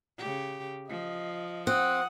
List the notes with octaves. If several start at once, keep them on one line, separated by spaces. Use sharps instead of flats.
C#3 G4
F3 D#5
C4 F#5 D#6 F#6